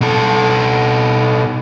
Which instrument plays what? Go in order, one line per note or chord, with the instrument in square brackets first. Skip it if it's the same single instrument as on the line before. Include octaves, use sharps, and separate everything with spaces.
[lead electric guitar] B2 A4